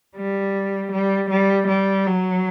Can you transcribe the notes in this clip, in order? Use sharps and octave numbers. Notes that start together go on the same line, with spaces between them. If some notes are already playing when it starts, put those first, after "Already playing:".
G3
G3
G3
G3
F#3